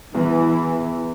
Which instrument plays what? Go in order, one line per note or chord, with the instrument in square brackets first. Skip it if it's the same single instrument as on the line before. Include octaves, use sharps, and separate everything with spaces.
[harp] E2 [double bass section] E3